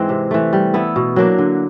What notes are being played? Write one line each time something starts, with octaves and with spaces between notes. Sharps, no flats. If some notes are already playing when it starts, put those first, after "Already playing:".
Already playing: G#2 E3 G#3 C4
C3
E3 A3
G3
B3 E4 A4
B2
F#3 A#3 D4
D3